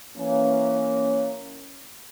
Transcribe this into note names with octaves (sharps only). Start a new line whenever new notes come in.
E3 A#3 C#4